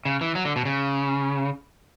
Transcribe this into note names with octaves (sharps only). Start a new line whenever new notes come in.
C#3
E3
F#3
D3
B2
C#3